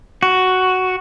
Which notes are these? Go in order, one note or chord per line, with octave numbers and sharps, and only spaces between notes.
F#4